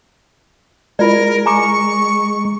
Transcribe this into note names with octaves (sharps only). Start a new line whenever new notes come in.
G#3 E4 F4 A#4 D5
G#5 A#5 C#6 D6